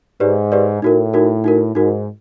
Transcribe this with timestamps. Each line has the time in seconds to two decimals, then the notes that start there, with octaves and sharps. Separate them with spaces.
0.20 G#2 G4 B4 D5
0.52 G4 B4 D5
0.82 A2 D#4 F#4 A#4
1.14 D#4 F#4 A#4
1.44 D#4 F#4 A#4
1.75 G#2 D#4 F#4 A#4